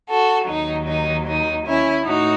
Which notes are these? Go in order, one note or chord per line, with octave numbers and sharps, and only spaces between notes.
F#4 A4
D#2 D#3 F#3 D#4
D#4
D#4
C#4 E4
A2 D#4 F#4